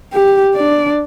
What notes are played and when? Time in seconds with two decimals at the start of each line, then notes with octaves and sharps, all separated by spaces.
0.13 G4
0.55 D4 D5